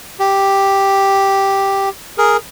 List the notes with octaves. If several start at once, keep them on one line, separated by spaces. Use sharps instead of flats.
G4
G#4 A#4